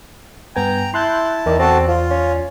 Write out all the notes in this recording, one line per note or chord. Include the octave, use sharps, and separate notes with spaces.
G2 B3 G5 G#5 A#5
E4 A5 C6 F#6 G6
E2 D#3 D5
C4 F#4 A4 A5
F3 F4
C#4